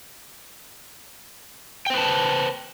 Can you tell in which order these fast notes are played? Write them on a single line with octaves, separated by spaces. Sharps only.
G5 C5 B4 A5